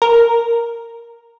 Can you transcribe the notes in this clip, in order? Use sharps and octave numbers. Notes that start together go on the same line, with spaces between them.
A#4